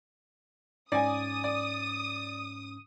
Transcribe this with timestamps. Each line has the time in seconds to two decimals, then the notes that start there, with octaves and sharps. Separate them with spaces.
0.92 G#2 C#4 D5 G#5 D6 D#6
1.44 D5